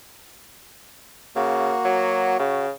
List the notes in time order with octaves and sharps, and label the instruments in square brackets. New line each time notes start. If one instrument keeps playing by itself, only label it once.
[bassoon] C#3 [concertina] A#3 F#4
[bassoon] F#3
[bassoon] C#3 [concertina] F#4